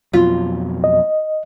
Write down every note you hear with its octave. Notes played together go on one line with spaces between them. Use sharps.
F2 B2 F#3 F4
D#5